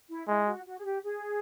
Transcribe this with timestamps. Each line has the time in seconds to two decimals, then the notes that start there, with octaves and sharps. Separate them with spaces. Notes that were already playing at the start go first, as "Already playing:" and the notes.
0.09 E4
0.28 G#3 E4
0.47 F#4
0.66 F#4
0.78 G#4
0.85 G4
1.04 G#4